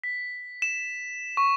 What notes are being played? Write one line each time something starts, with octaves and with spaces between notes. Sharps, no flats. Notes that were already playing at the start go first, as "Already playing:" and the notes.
B6
E7
C#6